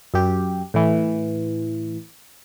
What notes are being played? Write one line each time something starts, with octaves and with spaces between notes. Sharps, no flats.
F#2 G4
A2 E3